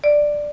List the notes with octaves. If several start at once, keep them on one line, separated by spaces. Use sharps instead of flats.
D5